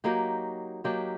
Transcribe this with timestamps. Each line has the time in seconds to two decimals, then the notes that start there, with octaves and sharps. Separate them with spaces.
0.04 F#3 A#3 D#4 G4
0.84 F#3 A#3 D#4 G4